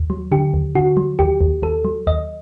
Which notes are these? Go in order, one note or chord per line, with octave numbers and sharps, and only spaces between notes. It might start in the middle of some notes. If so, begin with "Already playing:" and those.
Already playing: D#2
F#3
D3 G4
D#2
D3 F#4
F#3
D#2 G4
D#2
D#2 A4
F#3
D#2 D#5